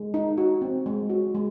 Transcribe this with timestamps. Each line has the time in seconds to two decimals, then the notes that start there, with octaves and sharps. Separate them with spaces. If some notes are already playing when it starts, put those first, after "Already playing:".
Already playing: G#3
0.14 D#4
0.38 F#4
0.62 C4
0.86 G#3
1.10 F#4
1.35 G#3